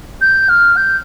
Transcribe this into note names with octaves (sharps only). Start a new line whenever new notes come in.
G6
F6
G6